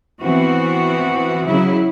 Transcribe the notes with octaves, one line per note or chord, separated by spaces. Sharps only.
E3 B3 C4 F#4
C#3 F#3 E4